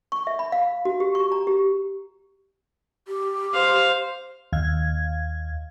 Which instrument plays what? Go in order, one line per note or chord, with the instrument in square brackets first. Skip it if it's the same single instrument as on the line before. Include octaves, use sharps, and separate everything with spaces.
[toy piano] C#6
E5
B5
F5
F#4
G4
C#6
A#5
G4
[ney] G4
[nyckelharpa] C5 F5
[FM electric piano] D#2 F5 G#6